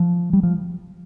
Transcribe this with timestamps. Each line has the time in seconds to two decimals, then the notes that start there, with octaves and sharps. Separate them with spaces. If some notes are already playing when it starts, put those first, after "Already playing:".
Already playing: F3
0.33 G3
0.43 F3